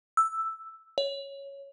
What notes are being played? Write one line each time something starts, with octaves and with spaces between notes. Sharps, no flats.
E6
C#5